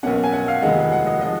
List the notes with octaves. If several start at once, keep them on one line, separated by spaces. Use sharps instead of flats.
B1 B2 A#3 C#4 F#5
G#5
F#5
F5
F1 D#2 D#3 G#3 F#5
F#5
D#5
F3 G#3 D#5